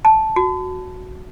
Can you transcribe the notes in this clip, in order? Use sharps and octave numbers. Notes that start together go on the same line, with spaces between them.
A5
F#4